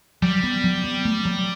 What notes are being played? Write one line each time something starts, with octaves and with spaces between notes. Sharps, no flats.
F#3 G3
B3
F#3
B3
A3
F#3